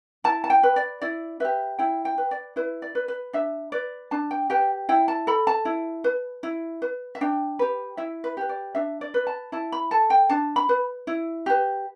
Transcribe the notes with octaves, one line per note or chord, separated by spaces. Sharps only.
E4 A5
A5
G5
B4
D5
E4 D5
G4 B4 E5
E4 G5
G5
B4
D5
E4 B4
D5
B4
B4
D4 E5
B4 D5
D4 A5
G5
G4 B4 G5
E4 G5
A5
A4 B5
A5
E4
B4
E4
B4
E5
D4 G5
G4 B4
E4 E5
B4
G4 B4
D5
D4 E5
D5
B4
A5
E4 A5
B5
A4 A5
G5
D4 A5
B5
B4
E4
G4 B4